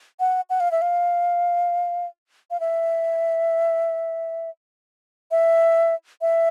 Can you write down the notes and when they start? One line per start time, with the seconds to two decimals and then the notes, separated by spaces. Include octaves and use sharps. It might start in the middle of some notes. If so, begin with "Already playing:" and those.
0.20 F#5
0.50 F#5
0.60 F5
0.72 E5
0.82 F5
2.51 F5
2.60 E5
5.31 E5
6.21 E5